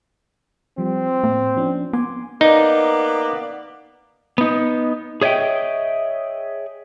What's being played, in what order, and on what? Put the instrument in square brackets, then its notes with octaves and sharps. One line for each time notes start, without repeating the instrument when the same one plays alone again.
[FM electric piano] F3 G3 [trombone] C4
[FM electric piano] A2 [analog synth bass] A#3
[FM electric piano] F3 C#4 D4
[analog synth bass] B3 [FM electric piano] G#5 C6 D6
[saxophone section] A#3 B3 D5 [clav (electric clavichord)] D#4
[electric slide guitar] B3 D#4
G#4 C#5 D#5 E5 G5